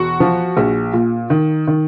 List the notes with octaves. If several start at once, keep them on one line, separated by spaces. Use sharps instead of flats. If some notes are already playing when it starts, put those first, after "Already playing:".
Already playing: E1 F#4
F3
A#1
A#2
D#3
D#3